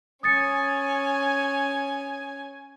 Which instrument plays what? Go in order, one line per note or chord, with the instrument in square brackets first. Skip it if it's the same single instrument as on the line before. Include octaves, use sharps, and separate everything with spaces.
[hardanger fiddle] C#4 G#5 [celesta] D#6 A6 C#7